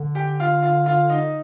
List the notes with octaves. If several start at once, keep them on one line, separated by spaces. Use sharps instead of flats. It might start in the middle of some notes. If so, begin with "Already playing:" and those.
Already playing: D3
G4 G5
F4 F5
F4 F5
F4 F5
D#4 D#5